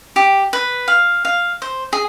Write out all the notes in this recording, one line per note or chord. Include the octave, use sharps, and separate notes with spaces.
G4
B4
F5
F5
C5
G#4